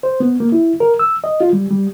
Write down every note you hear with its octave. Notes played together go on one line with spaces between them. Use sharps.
C5
B3
A#3
E4
A#4
E6
D#5
F4
G3
G3